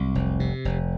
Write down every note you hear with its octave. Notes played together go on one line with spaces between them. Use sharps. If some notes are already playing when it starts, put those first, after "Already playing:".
Already playing: C2 F#3
F1
C3
F1